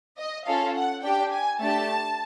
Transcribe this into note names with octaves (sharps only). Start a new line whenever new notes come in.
D#5
C#4 F4 A4 F5
F#5
D4 G4 G5
G#5
A3 D4 G4 A5